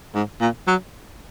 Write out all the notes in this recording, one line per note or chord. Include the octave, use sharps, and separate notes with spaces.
G#2
A#2
F#3